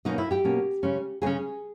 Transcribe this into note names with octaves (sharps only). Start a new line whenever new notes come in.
B2 A#3 C#4 D#4 D#5
E4 E5
G4 G5
B2 A#3 C#4
C#3 G#3 C#4
C#3 G#3 C#4 G#4 G#5